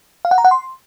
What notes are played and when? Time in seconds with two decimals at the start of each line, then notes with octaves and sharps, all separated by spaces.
0.25 F5
0.31 F#5
0.38 A#5
0.45 F#5
0.51 C6